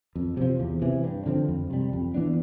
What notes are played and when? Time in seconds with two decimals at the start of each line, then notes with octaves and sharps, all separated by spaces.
0.16 F2
0.37 C3 F3
0.60 E2
0.82 C3 E3
1.04 G2
1.26 D3 F3 C4
1.49 F2
1.70 C3 G3
1.93 F2
2.15 E3 B3 D4